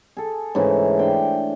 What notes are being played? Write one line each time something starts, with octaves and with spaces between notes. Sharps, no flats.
G#4 A4
G#2 C#3 E3 A3
D4 C5 G5